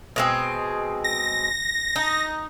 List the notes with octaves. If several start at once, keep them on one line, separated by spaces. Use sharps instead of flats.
B2 G#3 C4
A#6
D#4